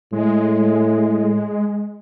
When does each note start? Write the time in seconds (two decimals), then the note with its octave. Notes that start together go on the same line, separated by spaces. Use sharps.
0.13 A2 G#3